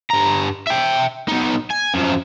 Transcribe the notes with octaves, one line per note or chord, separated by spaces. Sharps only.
G2 A#5
E5 G5
B2 D#4
G#5
F#2 F3